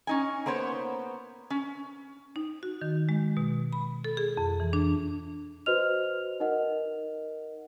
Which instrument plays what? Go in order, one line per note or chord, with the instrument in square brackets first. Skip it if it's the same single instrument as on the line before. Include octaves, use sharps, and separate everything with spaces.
[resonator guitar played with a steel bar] C#4 D#4 G#5
A#3 B3 C5 C#5
C#4
[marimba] D#4
F#4
D#3
G#3
B2
B5
A4
G#4
F2
E3
D4
[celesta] F#4 B4 C5 D#5 F6 F7
D#4 A#4 D#5 F#5